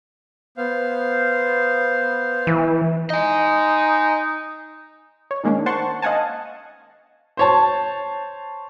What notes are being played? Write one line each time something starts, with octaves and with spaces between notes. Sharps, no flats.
B3 C5 F5
E3
D#4 D#5 G#5
C#5
D#3 G#3 A#3 C#4 D4
C5 F#5 A5 C6 C#6
D#5 F5 F#5 G#5 A5
C5 C#5 A5